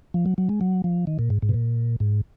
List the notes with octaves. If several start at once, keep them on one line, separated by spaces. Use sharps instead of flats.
F3
F#3
F#3
G#3
F#3
F3
D#3
A#2
G#2
G#2
B2
A#2
G#2